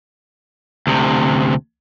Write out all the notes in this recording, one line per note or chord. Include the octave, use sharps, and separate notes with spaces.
D2 C3